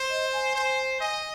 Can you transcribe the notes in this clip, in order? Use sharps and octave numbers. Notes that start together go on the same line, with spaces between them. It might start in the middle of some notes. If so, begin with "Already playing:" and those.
Already playing: C5
D#5
G#5
C5
D#5 G#5